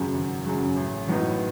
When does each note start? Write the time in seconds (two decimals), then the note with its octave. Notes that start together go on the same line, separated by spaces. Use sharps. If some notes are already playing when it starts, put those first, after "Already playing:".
Already playing: G#1 F#2 C#3 F#3
0.14 G#1
0.46 F#2 C#3 F#3
0.76 A1
1.08 A2 F#3 B3 D#4